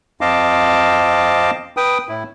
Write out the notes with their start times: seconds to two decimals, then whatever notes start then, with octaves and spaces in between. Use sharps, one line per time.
0.21 F2 C4 D#5 F5 A5 D6
1.77 B4 G5 D#6
2.09 A2 E4